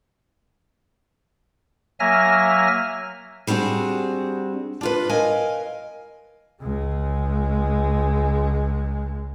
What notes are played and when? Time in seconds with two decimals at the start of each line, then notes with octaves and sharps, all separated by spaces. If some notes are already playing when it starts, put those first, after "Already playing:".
2.00 F#3 A#3 E5 G#5 F6 A#6
3.47 G3 C4 D4 F#4 G#4
4.81 D4 F4 B4
5.09 A#4 D#5 F5 G#5
6.61 C#2 G#3